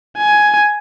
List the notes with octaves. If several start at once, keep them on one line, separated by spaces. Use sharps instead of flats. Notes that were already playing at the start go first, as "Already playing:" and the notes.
G#5